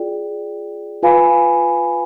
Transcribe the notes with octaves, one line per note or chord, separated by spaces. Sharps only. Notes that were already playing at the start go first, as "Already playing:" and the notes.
Already playing: F4 G#4 D5 G5
F4 B4 F5 G#5 B5